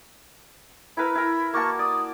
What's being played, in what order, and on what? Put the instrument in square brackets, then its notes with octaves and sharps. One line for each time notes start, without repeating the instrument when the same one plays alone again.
[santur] E4 A#4 B4 [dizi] B5
[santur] E4 A#4
[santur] A#3 F#4 A5 [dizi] C#6
[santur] D5 [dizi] D#6